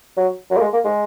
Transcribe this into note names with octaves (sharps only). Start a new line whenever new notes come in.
F#3
F#3
A#3
G#3
A#3
G#3